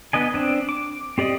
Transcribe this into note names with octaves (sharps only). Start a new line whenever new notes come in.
B3 D4 D#5 G#5
C4 D4
D6
C4 G4 D5 D#5